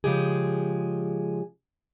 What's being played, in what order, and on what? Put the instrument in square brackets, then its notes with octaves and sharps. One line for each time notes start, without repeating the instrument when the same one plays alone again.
[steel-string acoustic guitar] C#3 F3 G#3 G4 G#4